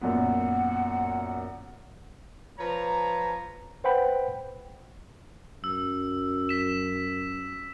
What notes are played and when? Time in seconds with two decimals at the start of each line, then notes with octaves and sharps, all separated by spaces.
0.01 F#2 A#2 B3 F#5
2.59 F3 B4 C#5 A#5
3.84 B4 C5 F#5 G5 B5
5.64 F#2 E6
6.49 B6 E7